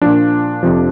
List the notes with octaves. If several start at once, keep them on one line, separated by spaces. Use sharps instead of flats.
A#2 F3 D4
F2 C3 F3